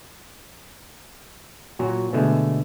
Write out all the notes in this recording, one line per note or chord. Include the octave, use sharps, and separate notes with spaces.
A#2 F#3 F#4 A#5
B2 D3 G#3 A3 E5